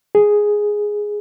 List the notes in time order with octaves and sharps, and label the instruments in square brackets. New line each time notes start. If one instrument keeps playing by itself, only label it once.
[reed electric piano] G#4